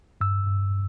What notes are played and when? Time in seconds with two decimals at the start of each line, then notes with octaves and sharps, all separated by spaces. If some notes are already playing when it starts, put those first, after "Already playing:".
0.21 G2 E6
0.48 G2